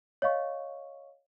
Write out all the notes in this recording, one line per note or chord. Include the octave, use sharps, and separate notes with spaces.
C#5 D#5 F5 C#6